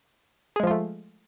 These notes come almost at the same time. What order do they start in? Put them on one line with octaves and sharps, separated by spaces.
G#4 G#3 F3 F4 A3